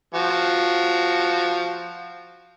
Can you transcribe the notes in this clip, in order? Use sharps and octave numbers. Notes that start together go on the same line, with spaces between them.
F3 F#4